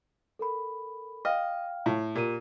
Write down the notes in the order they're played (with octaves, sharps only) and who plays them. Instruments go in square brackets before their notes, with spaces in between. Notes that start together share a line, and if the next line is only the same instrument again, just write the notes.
[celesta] A4 A#4 B5
[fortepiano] D#5 [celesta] F5 G5 F6
[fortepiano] A2
[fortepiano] A#2 [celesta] G4 A#4 D#7